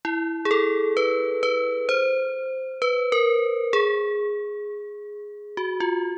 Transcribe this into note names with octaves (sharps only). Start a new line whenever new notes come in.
E4
G#4
A4
B4
B4
C5
B4
A#4
G#4
F#4
F4